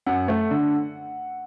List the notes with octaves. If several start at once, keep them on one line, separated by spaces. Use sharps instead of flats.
F#2 F#5
A3
D3